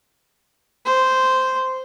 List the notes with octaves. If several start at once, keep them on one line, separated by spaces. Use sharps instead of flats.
C5